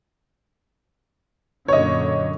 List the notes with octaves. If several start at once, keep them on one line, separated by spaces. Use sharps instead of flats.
F#2 A#2 D3 C#5 D#5